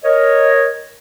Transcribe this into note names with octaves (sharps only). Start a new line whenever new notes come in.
A#4 C#5 D#5